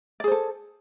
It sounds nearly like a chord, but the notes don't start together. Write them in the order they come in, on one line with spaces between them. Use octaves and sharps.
D5 G#4 C5 A4